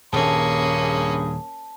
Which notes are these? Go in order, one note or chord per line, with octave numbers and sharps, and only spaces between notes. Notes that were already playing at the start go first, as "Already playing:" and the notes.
D#1 G2 A#3 C#4 G#4 A5 B5